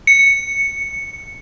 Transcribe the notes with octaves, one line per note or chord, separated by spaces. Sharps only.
C#7